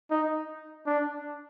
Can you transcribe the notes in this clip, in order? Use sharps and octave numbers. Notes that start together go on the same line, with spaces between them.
D#4
D4